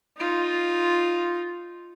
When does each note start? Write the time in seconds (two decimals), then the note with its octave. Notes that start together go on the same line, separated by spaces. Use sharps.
0.17 D#4 F4